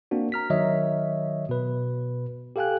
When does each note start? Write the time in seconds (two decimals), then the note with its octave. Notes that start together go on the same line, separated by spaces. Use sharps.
0.11 A#3 C4 D4 F#4
0.32 A#5 F6 B6
0.50 D#3 F#3 C#5 D#5 E5
1.49 B2 B4
2.56 G4 A4 F5 G5 G#5 F#6